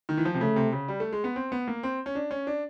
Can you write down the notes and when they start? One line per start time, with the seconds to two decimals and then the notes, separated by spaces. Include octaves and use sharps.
0.09 D#3
0.17 E3
0.25 F3
0.34 C3
0.41 C#3 A3
0.56 C3
0.73 C#3
0.88 G3
1.00 A3
1.13 G#3
1.24 B3
1.36 C4
1.52 B3
1.68 A#3
1.83 C4
2.06 C#4
2.15 D4
2.31 C#4
2.47 D4